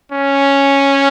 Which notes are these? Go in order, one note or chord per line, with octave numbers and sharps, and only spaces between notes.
C#4